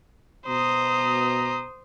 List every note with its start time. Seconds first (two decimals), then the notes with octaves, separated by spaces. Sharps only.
0.46 B2 C5 A#5 D#6